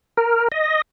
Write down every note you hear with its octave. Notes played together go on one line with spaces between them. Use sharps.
A#4
D#5